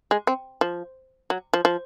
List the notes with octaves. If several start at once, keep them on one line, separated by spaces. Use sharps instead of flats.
G#3
C4
F3
F#3
F3
F3